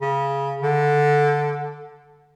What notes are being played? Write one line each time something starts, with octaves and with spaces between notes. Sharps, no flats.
C#3
D3